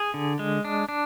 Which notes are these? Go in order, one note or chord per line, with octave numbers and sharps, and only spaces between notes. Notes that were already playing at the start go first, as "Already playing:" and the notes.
Already playing: G#4
D3
G#3
D4
D4